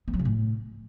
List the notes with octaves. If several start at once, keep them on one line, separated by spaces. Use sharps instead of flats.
B3
F#3
C#3
A2